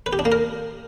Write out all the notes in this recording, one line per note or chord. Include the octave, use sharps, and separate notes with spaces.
B4
G4
D4
A#3
A#4